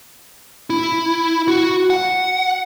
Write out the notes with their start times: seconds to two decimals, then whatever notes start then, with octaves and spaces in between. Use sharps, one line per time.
0.70 E4
1.48 F#4
1.90 F#5